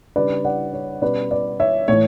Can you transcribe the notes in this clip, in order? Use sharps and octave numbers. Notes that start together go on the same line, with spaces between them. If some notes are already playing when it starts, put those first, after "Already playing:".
C#3 G3 D4 B4 D5
D5 F#5
C#5
B2 G3 C#4 B4 D5
B4 D5
C#5 E5
A2 E3 A3 C#5